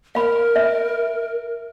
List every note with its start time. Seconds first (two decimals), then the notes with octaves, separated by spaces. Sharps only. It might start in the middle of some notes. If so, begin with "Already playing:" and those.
0.15 A#4 F5 B5
0.56 E5